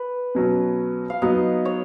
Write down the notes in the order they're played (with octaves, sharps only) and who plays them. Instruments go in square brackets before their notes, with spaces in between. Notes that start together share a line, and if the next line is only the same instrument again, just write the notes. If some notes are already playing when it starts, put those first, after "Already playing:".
Already playing: [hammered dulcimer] B4
[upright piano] B2 F#3 C#4
[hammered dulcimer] F5
[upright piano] F#3 B3 D#4 [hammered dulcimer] D#5
[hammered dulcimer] C#5